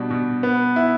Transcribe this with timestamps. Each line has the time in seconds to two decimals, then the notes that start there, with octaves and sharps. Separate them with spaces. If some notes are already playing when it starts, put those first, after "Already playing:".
Already playing: B2 G3 D4
0.10 B2
0.43 B3
0.76 E4